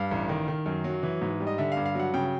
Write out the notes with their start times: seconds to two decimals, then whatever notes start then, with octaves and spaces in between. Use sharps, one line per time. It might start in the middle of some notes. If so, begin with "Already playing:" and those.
Already playing: G2 F5
0.11 A1
0.29 D#3
0.48 D#3
0.66 F#2
0.84 F#3
1.03 E3
1.22 G#2
1.40 G3
1.47 D#5
1.58 D3 E5
1.72 F5
1.77 G2
1.86 F5
1.95 F#3 F#5
2.14 C#3 G5